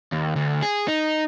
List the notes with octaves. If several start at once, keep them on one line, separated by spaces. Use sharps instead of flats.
D#2
D2
G#4
D#4